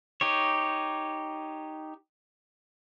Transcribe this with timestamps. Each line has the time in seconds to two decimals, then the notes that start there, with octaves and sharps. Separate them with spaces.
0.21 D#4 G4 C#5